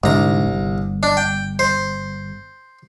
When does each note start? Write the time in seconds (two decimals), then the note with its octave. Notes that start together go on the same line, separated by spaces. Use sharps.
0.04 C2 G#2 D3 D4 A#5
0.47 G1
1.03 D4
1.17 G5
1.59 C5